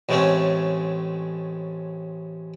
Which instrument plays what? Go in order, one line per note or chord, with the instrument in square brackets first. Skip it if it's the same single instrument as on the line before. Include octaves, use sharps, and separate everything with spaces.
[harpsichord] A1 A2 G#3 A3 C4 C#4